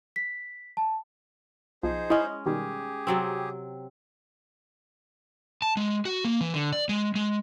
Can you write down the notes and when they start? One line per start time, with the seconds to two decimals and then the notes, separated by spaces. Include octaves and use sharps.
0.16 B6
0.77 A5
1.83 B1 F3 D#4 G#4 C5
2.10 G#3 C#4 E4 D#5
2.46 B2 D#3 G3 G4 G#4
3.07 C3 F#3 C4
5.62 A5
5.77 G#3
6.05 F#4
6.25 A#3
6.41 E3
6.54 D3
6.72 D5
6.89 G#3
7.15 G#3